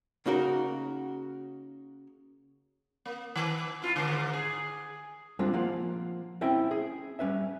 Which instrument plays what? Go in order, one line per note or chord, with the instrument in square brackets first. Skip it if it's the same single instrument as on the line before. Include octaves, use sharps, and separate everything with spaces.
[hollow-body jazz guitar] C#3 A#3 D#4 F#4 A#4
[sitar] A#3
D#3
E4 F4
G#2 D3
G#4
[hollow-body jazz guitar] G3 G#3 C4 D4 F4
F3 A#3 F4 F#5
C4 C#4 E4 E5 G5
G#4
G3 C#4 B4 E5